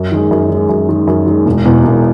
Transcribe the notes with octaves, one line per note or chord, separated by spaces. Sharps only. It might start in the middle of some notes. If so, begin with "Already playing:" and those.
Already playing: F#2
D#3 G#3
F#2
D#3 G#3
F#2
D#3 G#3
F#2
D#3 G#3
E1
E2 B2
E1